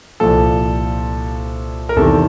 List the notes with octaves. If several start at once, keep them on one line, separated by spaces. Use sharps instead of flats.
C2 A#2 F3 A4
A#4
E2 C3 D#3 A4